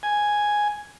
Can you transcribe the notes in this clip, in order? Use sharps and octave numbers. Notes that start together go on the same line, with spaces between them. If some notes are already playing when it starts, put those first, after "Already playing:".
G#5